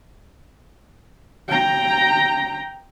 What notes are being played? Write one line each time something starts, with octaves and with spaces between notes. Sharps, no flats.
G5 A#5